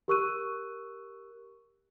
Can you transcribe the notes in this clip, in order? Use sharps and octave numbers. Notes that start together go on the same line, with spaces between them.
G4 A#4 C#6 E6 F#6 D#7